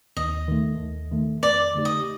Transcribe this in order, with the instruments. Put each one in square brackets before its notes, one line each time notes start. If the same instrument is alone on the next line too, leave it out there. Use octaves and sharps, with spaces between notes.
[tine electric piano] D#2 [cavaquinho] D#5
[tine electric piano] D#3 A3
D#2
D#3 A3
[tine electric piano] F2 [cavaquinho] D5
[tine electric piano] D3 A3 D#4 G4
[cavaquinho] D#5